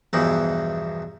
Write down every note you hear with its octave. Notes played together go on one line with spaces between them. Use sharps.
E2 G2 B2 E3 F3 D#4